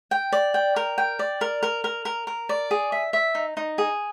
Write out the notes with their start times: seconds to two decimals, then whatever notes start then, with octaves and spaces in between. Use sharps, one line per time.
0.11 G5
0.32 D5
0.54 G5
0.76 A#4
0.98 G5
1.19 D5
1.41 A#4
1.63 A#4
1.84 A#4
2.05 A#4
2.27 A#4
2.49 D5
2.71 G#4
2.92 E5
3.13 E5
3.35 D#4
3.57 D#4
3.78 G#4